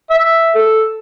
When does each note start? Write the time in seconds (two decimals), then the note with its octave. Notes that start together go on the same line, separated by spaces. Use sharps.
0.10 E5
0.55 A4